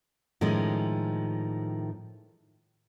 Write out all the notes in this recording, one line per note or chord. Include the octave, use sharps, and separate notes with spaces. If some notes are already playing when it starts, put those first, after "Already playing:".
A2 D#3 F3 G#3 C#4